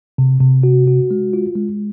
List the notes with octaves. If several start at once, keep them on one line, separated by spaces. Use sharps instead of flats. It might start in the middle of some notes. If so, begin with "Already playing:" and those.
C3
C3
F#4
F#4
G#3
F4
G#3